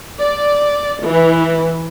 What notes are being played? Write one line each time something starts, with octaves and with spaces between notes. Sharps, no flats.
D5
E3